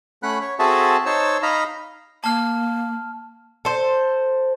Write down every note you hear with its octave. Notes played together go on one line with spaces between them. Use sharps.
A3 C#4 F#5 B5 F#6
C#5
C4 F#4 G#4 A4 E5 A5
D#4 C5 C#5 A5 E6
D#4 D#5 F5 A#5 B5
A#3 A5 F6
A4 C5